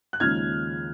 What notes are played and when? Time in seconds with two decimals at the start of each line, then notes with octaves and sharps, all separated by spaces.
0.13 F#6
0.20 D#2 C#3 F3 G#3 D#4 F6 G#6